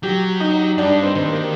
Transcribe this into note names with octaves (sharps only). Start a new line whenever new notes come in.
F#3 G4
D#4
G2 D4
C4
D#3 C4
A#3